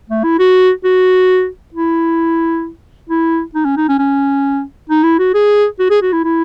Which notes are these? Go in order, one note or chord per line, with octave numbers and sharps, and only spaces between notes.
A3
E4
F#4
F#4
E4
E4
D#4
C#4
D#4
C#4
C#4
D#4
E4
F#4
G#4
F#4
G#4
F#4
E4
E4